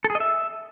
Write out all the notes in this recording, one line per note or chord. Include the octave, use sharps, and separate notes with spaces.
A4
G#4
D#5
E5